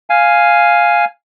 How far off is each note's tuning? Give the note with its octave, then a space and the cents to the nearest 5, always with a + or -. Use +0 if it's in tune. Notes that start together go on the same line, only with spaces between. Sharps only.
F5 +0 G#5 +0